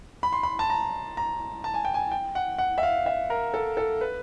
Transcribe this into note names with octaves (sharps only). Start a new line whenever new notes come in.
B5
C6
B5
A5
A#5
A#5
A5
G#5
G5
G#5
G5
F#5
F#5
E5
F5
E5
A#4
A4
A4
B4